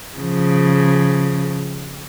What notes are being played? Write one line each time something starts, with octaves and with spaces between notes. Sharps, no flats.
C#3 F3